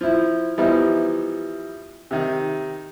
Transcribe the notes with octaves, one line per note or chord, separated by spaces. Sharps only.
F3 E4
E3 F3 G3 B3 D#4 E4
C3 D#3